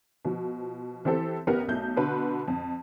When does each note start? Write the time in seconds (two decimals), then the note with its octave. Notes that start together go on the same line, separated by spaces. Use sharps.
0.25 B2 F3
1.05 E3 C4 G4 A4 C5
1.47 A1 B3 G4 A#4
1.68 B1 A3 G6
1.96 B2 D3 B4
2.48 F2